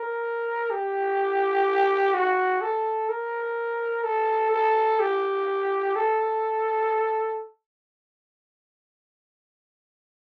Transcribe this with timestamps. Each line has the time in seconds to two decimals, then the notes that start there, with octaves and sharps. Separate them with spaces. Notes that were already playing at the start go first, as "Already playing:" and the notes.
Already playing: A#4
0.71 G4
2.14 F#4
2.61 A4
3.09 A#4
4.04 A4
4.52 A4
5.00 G4
5.96 A4